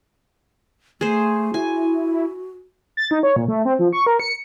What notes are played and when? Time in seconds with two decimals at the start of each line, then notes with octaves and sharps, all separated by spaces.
1.01 A3 G#4 C5
1.54 E4 F#4 G#5
2.97 A6
3.11 D#4
3.23 C#5
3.36 A#2
3.48 A3
3.65 C4
3.79 F3
3.93 C#6
4.07 A#4
4.20 C#7